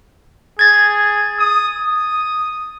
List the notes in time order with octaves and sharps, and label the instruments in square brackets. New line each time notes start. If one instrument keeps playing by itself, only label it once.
[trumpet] G#4 [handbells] G#6 A6
[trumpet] D#6
D#6